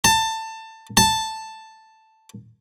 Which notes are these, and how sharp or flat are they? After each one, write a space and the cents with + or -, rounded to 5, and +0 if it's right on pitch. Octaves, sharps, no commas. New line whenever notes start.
A5 +20
A5 +5